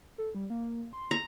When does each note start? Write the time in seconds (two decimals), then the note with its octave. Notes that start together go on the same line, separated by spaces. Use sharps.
0.18 A4
0.35 G3
0.50 A#3
0.93 C6
1.11 A#5